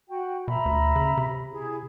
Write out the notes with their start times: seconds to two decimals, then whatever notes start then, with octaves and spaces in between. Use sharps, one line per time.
0.09 F#4 F#5 G5
0.48 B2 E5 A#5 B5
0.66 D2
0.96 C#3
1.17 C3
1.52 E4 G#4